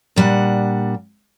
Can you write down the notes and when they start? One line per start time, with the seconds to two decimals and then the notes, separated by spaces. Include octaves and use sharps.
0.16 A#2 G3 D4 F#5